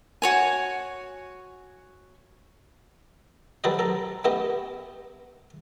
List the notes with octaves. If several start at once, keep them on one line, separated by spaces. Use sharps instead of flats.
F#4 C#5 G#5
F#3 G3 A4 B4 C5 D#5
A4 A#5
A3 B3 G4 D#5